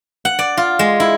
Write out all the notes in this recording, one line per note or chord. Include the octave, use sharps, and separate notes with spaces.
F#5
D5
F4
G#3
E4